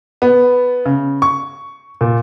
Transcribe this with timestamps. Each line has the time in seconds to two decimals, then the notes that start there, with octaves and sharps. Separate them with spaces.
0.22 B3
0.85 C#3
1.22 C#6
2.01 A#2